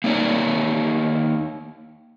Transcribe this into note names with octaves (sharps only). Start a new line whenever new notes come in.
A#3 D#4 C#5 D5